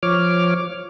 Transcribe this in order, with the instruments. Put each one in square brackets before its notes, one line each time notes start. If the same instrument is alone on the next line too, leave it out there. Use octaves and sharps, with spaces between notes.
[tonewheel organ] F3 C#5 D6 F6